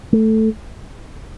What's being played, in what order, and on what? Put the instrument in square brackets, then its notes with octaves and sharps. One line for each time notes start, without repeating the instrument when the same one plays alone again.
[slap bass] A3